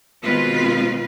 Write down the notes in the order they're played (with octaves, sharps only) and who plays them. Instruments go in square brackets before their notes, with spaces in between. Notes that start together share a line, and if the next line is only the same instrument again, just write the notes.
[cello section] B2 D#3 G#3 C4 F4 B4